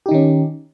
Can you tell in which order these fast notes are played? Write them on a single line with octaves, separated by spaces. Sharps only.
G4 D#4 D#3 C#4